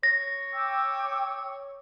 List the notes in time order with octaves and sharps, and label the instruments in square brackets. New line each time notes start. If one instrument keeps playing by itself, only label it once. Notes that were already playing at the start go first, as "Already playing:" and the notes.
[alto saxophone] C#5 [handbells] A#6
[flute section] G5 D6 E6